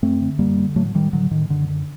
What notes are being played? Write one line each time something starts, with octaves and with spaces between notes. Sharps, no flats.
F#2 A3 C4
D3
F#2 G3 A#3
D3
A2 F#3 A3
F#3
A2 D#3 G3
A2 D3 F#3
A2 D#3
F#2 D3
D3